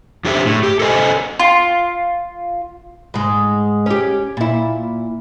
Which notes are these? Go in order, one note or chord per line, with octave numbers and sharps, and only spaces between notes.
F2 D4 G4 G#4 C5 E5
A2
G4
A4 A#4 C5 D#5 G#5
F4
G#2 G#3
C#4 G4
A#2 E4